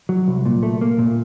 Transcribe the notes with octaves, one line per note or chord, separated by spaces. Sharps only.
F#3
C2
A#2
A3
A#3
A#2